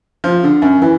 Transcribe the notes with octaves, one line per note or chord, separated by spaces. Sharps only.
F3
D3
F#2
E3